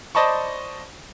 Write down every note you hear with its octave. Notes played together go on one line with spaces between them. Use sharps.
C5 D5 D#5 A5 B5 C#6